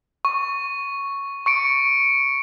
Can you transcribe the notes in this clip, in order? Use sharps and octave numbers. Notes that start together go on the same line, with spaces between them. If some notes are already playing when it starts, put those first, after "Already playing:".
C#6
C#6 C#7 D7